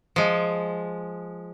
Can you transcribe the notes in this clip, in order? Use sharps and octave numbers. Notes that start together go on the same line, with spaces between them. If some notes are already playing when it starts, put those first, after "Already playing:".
F3 G#3